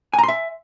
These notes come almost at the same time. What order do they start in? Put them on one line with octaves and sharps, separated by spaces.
G#5 A#5 C6 E5